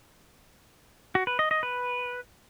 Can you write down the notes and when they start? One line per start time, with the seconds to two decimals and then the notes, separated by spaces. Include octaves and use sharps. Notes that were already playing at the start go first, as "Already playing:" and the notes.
1.15 F#4
1.27 B4
1.39 D#5
1.51 D#5
1.63 B4